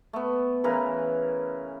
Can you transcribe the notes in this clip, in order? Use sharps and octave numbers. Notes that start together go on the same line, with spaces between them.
A3 B3
C#3 E3 A#4 B4